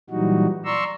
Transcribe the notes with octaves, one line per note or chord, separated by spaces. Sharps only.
A#2 E3 F#3 G3 D#4 F#4
D5 A#5 C6 C#6 E6